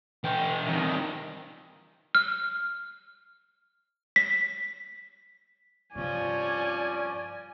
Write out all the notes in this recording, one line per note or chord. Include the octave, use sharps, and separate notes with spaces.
E3 G5
C2 D#3
F6
B6
G2 C3 F3 C#4 D5 G#5